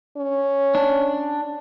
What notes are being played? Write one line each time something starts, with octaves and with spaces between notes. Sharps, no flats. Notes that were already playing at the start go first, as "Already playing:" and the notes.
C#4
D4